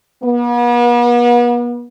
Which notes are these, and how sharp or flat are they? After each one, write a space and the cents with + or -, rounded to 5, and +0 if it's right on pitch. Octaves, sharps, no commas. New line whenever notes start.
B3 -40